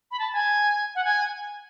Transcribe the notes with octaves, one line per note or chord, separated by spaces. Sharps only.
B5
A5
G#5
F#5
G#5